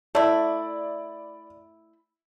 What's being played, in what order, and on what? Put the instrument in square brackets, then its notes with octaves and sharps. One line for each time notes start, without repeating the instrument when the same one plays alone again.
[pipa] A3 E4 [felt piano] D5